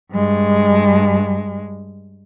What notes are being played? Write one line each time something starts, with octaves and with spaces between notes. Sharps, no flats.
G2 G#3